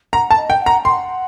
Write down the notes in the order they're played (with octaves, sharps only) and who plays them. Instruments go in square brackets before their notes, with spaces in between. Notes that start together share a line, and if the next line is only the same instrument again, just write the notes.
[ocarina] F#5 [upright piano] A#5
[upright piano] A5
[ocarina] D#5
[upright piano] G5
[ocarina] F#5
[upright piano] A#5
[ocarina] F#5 G5 [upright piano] C6